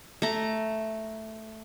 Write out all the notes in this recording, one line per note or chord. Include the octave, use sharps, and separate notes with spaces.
A3 A#5